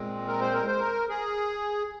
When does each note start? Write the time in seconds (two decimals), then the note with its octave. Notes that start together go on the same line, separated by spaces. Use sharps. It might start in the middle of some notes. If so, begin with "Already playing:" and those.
Already playing: A#2 G#3 C4
0.27 A#4
0.41 C5
0.53 A#4
0.67 C5
0.79 A#4
1.09 G#4